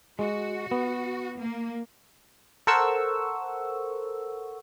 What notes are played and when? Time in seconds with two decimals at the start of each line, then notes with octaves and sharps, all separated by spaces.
0.19 G#3 F#4
0.71 B3
1.39 A#3
2.67 A4 A#4 C5 F#5 C#6 E6